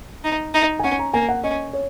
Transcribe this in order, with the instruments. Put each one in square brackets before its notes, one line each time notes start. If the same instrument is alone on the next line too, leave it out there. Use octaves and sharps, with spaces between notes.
[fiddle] D#4
D#4
[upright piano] G#5
[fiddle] C#4 [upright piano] F#5
[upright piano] A#5
[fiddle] A#3 [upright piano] G#5
[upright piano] F#5
[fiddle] C#4 [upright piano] D#5
[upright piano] C#5